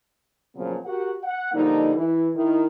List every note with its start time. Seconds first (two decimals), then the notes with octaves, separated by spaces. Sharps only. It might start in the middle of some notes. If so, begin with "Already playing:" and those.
0.55 A#2 C#3 F3 F#3 B3 C4
0.85 F#4 G4 A#4 F#5
1.23 F#5
1.53 D3 F3 G3 A#3 D#4
1.96 E3 E4 B4
2.35 D#3 E4